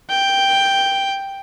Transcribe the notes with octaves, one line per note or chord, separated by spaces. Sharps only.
G5